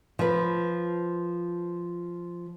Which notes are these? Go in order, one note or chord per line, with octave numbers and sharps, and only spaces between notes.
F3 B4